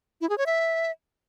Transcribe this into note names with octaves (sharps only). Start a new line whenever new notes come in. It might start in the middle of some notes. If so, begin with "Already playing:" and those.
E4
G#4
C#5
E5